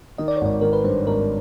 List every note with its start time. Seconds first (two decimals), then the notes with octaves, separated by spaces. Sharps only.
0.18 D#3 D#5
0.28 D5
0.37 C#5
0.41 G#1 D5
0.61 D#3 A#4
0.73 B4
0.84 G2 C5
1.07 G#1 A#4